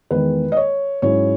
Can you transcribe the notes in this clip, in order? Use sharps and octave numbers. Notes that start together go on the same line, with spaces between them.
E2 D#3 G#3 B4
D#5
C#5
G#2 F#3 C#4 E4 C#5